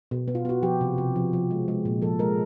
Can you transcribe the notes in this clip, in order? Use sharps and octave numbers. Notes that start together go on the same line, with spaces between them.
B2
B3
F4
B3 F#4
F3 G4
C3
C3
F3
F3
G#3
G#3
A#2
F3 A4
G#3 A#4